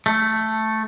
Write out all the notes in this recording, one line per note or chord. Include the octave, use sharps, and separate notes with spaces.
A3